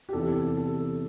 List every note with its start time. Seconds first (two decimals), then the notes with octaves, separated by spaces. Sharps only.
0.09 G4
0.13 E2 C3 E3 A4
0.57 A4